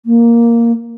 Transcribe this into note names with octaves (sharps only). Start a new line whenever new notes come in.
A#3